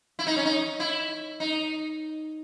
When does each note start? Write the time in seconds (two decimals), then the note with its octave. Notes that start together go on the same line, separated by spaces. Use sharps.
0.19 E4
0.27 D#4
0.37 C#4
0.45 D#4
0.80 E4
1.40 D#4